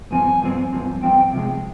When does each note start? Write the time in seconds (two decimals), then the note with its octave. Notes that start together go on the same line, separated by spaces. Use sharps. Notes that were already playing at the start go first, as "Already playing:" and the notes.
0.11 G2 F3 C4 G#5
0.42 G2 F3 C4
0.72 G2 F3 C4
1.03 G2 F3 C4 G5
1.33 C3 F3 G#3